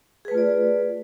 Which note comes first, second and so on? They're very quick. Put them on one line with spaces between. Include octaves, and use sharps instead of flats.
G#4 B4 A3 F4 D5